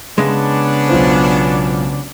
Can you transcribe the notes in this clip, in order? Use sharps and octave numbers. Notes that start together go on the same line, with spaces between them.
C#3 G#3 B3 C#4 D4
B1 F4 C5